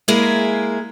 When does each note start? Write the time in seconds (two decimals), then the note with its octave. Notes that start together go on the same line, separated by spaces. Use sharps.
0.08 G#3 A#3 E4 G#4 A#4